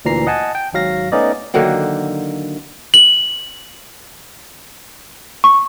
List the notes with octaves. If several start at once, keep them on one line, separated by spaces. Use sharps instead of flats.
D2 A#2 E3 A#5 C7
D#5 F#5 G#5 A5
G5
G#1 G#2 F#3 F5 A#6
A3 B3 C#4 D#4 D5 D#5
D3 D#3 F#3 A#3
F#7
C#6